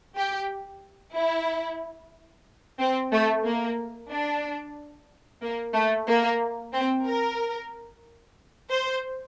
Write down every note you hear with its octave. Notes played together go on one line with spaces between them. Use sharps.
G4
E4
C4
A3
A#3
D4
A#3
A3
A#3
C4
A#4
C5